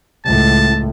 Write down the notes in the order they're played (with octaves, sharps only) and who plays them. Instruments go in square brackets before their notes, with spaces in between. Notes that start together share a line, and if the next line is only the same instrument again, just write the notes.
[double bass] C#2 A2 [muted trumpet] A5